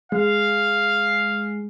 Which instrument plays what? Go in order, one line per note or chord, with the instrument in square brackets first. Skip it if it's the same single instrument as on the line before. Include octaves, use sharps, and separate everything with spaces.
[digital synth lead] G#3 [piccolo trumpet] F5